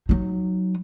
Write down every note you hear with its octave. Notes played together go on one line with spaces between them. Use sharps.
F#3 D#4